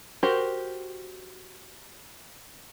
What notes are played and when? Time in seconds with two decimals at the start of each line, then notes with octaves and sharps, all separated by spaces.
0.23 F#4 G4 A#4 C5